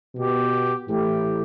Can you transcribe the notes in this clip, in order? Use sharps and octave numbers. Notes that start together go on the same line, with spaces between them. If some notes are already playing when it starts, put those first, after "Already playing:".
B2 B3 G4
A2 E3 A3 G4